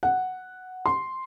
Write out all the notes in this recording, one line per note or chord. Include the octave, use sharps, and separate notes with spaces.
F#5
C6